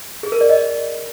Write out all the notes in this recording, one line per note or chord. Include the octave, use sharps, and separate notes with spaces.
G#4
A#4
D5
D#5